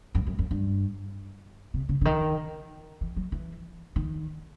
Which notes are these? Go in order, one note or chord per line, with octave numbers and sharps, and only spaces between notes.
F#2
F#2
F#2
G2
C3
C#3
D3
D#3
E3
F#3
E3
D#3